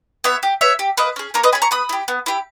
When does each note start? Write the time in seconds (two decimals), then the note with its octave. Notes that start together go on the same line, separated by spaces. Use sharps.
0.24 B3 C#5 E5
0.43 G4
0.61 B3 C#5 E5
0.79 G4
0.97 A#3 B4 D#5
1.16 C#4 G#4
1.34 A#3 A#4 C#5
1.43 B4 D#5
1.52 C#4 G#4 G#5 B5
1.62 A#5 C#6
1.71 B3 B5 D#6
1.89 E4 G4
2.08 B3
2.26 E4 G4